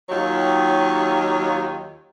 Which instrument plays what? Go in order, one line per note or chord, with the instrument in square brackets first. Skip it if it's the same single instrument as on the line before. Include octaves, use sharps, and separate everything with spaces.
[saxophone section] D#2 D#3 F#3 F4 C#5